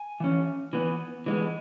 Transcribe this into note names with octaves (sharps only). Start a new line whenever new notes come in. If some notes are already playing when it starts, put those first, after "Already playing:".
Already playing: G#5
E3 C#4
E3 B3
E3 G#3 B3